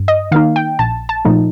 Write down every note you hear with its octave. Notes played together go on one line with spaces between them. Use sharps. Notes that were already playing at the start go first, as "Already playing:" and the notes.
Already playing: G2
D#5
D#3 A#3 D#4 F5
G5
A#1 A5
A5
A#2 F3 A3 D#4